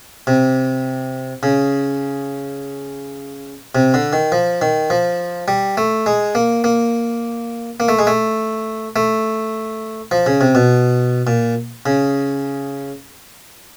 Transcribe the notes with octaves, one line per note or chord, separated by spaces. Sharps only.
C3
C#3
C3
D3
D#3
F3
D#3
F3
G3
A3
G#3
A#3
A#3
A#3
A3
G#3
A3
A3
F3
C#3
C3
B2
A#2
C#3